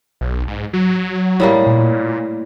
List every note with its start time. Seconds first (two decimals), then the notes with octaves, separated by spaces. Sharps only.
0.21 B1
0.48 G#2
0.73 F#3
1.40 A2 G3 A#3
1.66 A#2